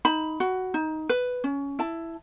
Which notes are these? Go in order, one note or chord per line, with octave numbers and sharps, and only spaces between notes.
D#4 B5
F#4
D#4
B4
C#4
E4 A5